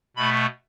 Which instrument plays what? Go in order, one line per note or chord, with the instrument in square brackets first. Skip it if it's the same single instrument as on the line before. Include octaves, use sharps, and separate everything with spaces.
[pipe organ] B2 A3 B5